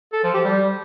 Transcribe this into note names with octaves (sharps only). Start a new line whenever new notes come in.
A4
F3
G4
G3